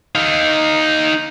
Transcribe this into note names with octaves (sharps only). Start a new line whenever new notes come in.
D#4 F5